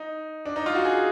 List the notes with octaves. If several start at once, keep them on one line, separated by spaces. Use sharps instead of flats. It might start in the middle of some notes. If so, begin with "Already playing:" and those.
Already playing: D#4
D4
D#4
F4
F#4
G#4